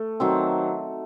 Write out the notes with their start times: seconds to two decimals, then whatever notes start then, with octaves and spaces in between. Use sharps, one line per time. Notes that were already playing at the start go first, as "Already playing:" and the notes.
Already playing: A3
0.20 D#3 F#3 C4